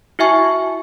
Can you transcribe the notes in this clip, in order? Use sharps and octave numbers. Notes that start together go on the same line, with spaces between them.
E4 F#4 E5 G#5 C#6